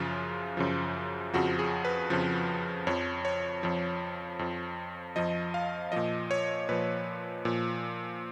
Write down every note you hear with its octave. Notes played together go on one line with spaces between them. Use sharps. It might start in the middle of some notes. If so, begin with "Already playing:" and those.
Already playing: F#2 C#3 F3 F4
F#2 C#3 F3
F2 C#3 F3 F#4
G#4
B4
F2 C#3 F3
F2 F3 C#5
C#5
F2 F3
F2 F3
F2 F3 D#5
F5
A#2 F3 D#5
C#5
A#2 F3 B4
A#2 F3